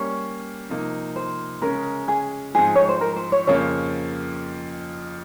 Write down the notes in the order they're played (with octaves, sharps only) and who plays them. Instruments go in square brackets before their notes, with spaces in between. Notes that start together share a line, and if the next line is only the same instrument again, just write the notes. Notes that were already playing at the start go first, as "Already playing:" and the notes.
Already playing: [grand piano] G3 A#3 C#4 [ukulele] C#5
[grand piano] C3 F3 A#3 D#4
[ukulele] C5
[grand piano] C#3 G#3 C#4 [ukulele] A#4
[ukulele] G#4
[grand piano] G#2 F3 C4 D#4 [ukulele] G#4
[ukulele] C#5
C5
A#4
C5
C#5
[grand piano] F2 C#3 F3 A#3 [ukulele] C#5